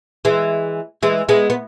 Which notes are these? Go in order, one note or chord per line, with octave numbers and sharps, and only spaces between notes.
E3 G#3
E3 G#3
G#3 B3
B3